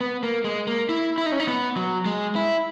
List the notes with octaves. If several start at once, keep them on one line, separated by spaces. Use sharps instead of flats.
B3
A#3
G#3
A#3
E4
E4
D#4
C#4
D#4
B3
F#3
G#3
E4